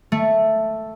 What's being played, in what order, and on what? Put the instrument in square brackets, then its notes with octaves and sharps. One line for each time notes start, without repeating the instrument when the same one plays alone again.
[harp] A3